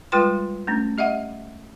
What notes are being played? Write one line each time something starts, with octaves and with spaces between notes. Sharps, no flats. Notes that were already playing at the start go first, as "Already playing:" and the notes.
G3 G#3 F4 B4 G5 C6
A3 C#4 D4
G4 D#5 E5 F#5